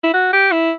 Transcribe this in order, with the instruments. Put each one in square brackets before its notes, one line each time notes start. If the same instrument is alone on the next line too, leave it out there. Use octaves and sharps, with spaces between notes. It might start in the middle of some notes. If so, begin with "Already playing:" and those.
[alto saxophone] E4
F#4
G4
E4